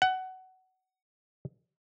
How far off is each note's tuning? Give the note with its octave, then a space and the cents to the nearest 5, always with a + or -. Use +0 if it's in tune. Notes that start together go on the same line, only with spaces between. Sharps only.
F#5 +20